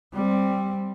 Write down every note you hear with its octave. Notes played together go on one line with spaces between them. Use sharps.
G3 C4